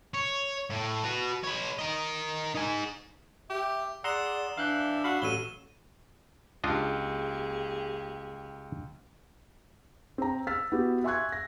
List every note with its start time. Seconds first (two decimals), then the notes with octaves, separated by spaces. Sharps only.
0.14 C#5
0.70 A2
1.04 F#4 B4
1.44 B4 C#5
1.79 A#4 D#5
2.55 D#4 G#5
3.50 G4 E5
4.04 G#4 D5 F#5 A#5 C6 E6 E7 G7
4.57 E3 D4 F5 F#6 G6
5.04 F#4 F5 B5
5.22 A1 F#3 A4 D#7 E7 G7
6.64 C#2 A#3 D4 F4 G4 G#4 D#5
10.18 C4 A#5
10.47 E6 F6 A6 B6
10.72 B3 E4 F#4 G4
11.04 E5 G#5 C6 C#6 F#6 G#6
11.32 A#6